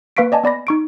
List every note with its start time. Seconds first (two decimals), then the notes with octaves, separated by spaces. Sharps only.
0.17 A#3 B4 F5 C#6 B6 D7
0.32 D5 D#5 G#5 A5
0.44 B3 D5 B5 A#6
0.67 D#4 C#6 D7